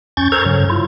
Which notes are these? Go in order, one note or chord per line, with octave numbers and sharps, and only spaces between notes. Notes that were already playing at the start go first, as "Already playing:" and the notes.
F2 C#4 C#6 G6 A6
A4 A#4 C5 A#5 C#6 G#6
G2 C#3 F#3
E4 F4